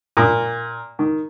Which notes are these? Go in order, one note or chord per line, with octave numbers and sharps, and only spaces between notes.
A#2
D#3